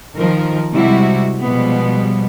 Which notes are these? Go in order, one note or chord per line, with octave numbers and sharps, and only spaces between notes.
D#3 F3 A#4
C3 G3 G#3 E4 F#4
B2 F3 G3 G#3 B3